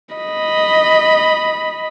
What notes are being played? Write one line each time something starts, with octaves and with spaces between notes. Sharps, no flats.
D#5 B5